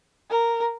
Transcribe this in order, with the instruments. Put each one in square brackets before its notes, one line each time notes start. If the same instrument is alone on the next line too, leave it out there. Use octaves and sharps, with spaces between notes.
[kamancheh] A#4